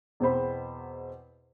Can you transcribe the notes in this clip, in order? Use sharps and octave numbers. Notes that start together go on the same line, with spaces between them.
E2 B2 C4 G#4 C5 B5